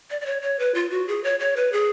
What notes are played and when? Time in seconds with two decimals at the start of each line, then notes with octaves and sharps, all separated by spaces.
0.10 D5
0.21 D5
0.26 C#5
0.42 C#5
0.59 B4
0.74 F4
0.91 F#4
1.08 G#4
1.24 C#5
1.40 C#5
1.56 B4
1.73 G#4